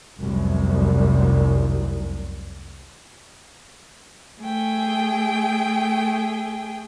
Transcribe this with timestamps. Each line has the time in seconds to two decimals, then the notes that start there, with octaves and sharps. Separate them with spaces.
0.17 F1 C2 F#2
4.39 A3 G#4 G5